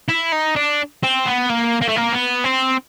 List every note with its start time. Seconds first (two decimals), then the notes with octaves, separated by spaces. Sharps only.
0.09 E4
0.32 D#4
0.56 D4
1.03 C4
1.26 B3
1.50 A#3
1.82 A#3
1.89 A3
1.96 A#3
2.13 B3
2.44 C4